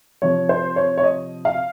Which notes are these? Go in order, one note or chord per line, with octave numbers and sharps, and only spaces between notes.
C3 F3 C#5
C5
C#5
C#5
D#5
F5